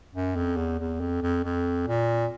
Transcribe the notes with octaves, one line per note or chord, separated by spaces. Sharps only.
F#2
F2
E2
E2
F2
F2
F2
A#2